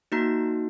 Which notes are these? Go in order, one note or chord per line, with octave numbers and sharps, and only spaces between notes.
A#3 D#4 F#4 A#5